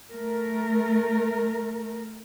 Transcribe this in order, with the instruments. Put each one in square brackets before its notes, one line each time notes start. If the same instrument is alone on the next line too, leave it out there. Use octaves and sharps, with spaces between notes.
[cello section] A3 A#4